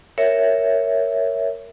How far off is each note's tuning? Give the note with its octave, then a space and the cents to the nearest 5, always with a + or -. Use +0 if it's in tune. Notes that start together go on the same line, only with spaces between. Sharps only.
A#4 +0 C#5 +0 E5 +0